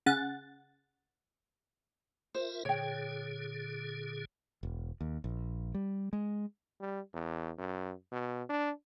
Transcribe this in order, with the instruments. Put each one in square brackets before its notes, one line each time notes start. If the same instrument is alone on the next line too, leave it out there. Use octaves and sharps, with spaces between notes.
[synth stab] C#3 F#5 A6
[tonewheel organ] F4 A#4 E5 [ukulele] C5
[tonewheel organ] A#2 D3 G#4 [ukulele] C#5 G5
[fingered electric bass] E1
D#2
A#1
G3
G#3
[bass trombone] G3
E2
F#2
B2
D4